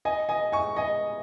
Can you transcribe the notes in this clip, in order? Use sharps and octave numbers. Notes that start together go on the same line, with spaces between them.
D#5 G#5
D#5 G#5
G#5 C#6
D#5 G#5